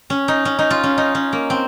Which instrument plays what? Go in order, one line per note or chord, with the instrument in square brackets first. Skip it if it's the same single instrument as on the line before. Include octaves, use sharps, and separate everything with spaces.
[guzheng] C#4
D#4
C#4
D#4
F4
C#4
D#4
C#4
A#3
C4